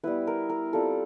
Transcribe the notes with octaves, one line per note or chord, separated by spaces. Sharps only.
G3 B3 E4 B4
A#4
A#4
G3 C4 F4 A4